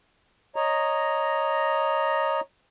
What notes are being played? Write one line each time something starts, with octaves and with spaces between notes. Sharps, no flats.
C#5 D#5 A#5